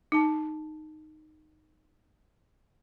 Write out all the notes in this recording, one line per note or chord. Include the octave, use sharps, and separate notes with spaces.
D#4 A5